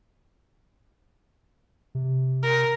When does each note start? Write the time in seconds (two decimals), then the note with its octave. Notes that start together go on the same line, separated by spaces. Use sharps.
1.95 C3
2.43 A#4